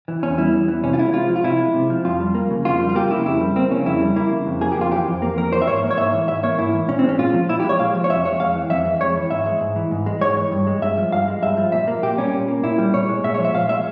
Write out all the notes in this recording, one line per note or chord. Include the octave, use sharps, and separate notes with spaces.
E3
E2 C#4
G3 E4
E2
E3
C3 C#4
F4
G#3 E4
C3 F4
F3
F4
C3 E4
G#3
C3
F3
F2 F4
G3
A#3
C#3
F2 F4
G3
F4
A#3 G4
C#3 E4
F2 E4
G3
A#3 C4
C#3 C#4
F2 E4
G3
A#3 E4
C#3
F2
A#3 G#4
G4
F2 F4
E3 G4
F2
A#3
F2 A#4
E3 C5
E5
G#2 C#5
A#3
C#5
G#2 E5
E3
G#2 E5
A#3 C#5
G#2 E4
E3
A#2 C#4
C4
G#3 C#4
A#2 F4
F3
A#2 E4
G4
G#3 C#5
A#2 F5
F3
C#5
F2 E5
G#3 C#5
F2 F5
E3
F2 E5
G#3
F2 C#5
E3
G#2 E5
G#3
G#2
E3
G#2
G#3
G#2 C#5
E3
G2
G#3
G2 E5
F3
G2 F5
G#3
G2 E5
F3
A#2 E5
A#3
A#2 G4
G3 C#4
A#2
A#3
A#2 E4
G3
A#2 C#5
G#3
A#2 E5
C#5
F3
E5
A#2 F5
G#3 E5